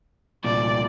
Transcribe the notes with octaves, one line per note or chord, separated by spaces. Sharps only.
C2 A#2 D5